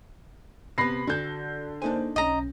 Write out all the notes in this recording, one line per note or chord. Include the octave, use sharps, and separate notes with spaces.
C3 B3 B5 A#6 C7
D3 F#4 A4 G6
A#3 D4 D#4 A4 C5 G#5
B1 C#4 D#5 A#5